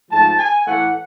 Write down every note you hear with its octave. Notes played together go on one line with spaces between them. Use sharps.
G#2 F3 A3 A5
G#5
A2 E3 A3 F#5